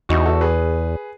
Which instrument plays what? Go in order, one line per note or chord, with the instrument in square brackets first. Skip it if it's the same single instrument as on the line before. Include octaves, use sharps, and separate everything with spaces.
[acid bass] E2 [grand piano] D#4 F#4
[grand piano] F#4 A4
G#4 B4